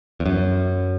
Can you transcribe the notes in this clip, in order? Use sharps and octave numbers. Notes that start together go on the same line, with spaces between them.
E2
F#2